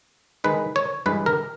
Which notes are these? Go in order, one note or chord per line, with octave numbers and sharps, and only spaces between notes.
D#3 G#3 D#4 B4
C#5
G2 E3 G#3 B4
A#4